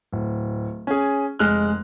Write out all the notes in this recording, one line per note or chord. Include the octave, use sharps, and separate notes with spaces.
D1
C#4 G#4
F1 G#3 F6 F#6